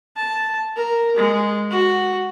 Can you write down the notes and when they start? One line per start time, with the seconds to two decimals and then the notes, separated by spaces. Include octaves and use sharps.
0.16 A5
0.76 A#4
1.16 G#3
1.71 F#4